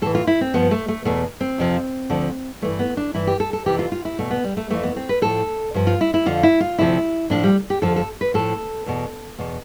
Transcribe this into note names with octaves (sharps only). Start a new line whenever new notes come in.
A2 E3 A4
F4
E4
C4
G2 F3 B3
A3
A3
E2 B2 A3
C4
F2 C3 F3
D2 D3 F3
G2 E3 A3
B3
D4
G2 E3 E4
G4
A4
A4
F2 C3 E3 G4
F4
F4
E4
E2 B2 A3
B3
G3
A3
F2 E3 A3
B3
C4
B4
A2 F3 A4
G2 F3
F4
E4
E4
F2 D3 F3 F4
E4
F4
D2 C3 F3 E4
A2 F3 D4
G3
G4
F2 D3 F3 A4
A4
B4
A2 F3 A4
E2 B2
E2 B2